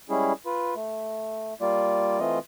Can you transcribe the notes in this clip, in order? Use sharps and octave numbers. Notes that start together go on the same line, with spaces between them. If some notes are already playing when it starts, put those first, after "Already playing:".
G3 G#3 C#4 E4 G#4
F4 B4
A3
G3 A#3 F4 D5
E3 A3 C4 F4 D#5